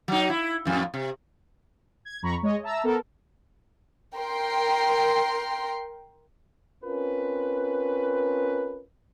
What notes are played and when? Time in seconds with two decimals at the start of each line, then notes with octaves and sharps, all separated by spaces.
0.08 F#3 D#4
0.30 E4
0.65 F2 A2
0.94 C3
2.05 G#6
2.22 F2 A#5 B5 C#6
2.42 G#3 C#5 D#5
2.63 E5 A5 A#5 E6
2.83 B3 A4 A#4
4.16 A#4 G5 C6
6.84 C4 C#4 F4 A#4 B4